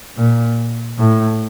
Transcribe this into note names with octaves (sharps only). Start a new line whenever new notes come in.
A#2
A2